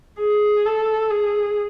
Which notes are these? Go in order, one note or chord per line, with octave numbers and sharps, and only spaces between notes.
G#4
A4
G#4